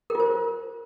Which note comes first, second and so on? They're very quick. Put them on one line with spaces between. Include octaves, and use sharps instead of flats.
A#4 F4 C5